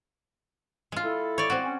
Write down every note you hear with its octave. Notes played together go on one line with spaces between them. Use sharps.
G#3 F4
E4 A4
C#5 D5
C4 F#4
C#4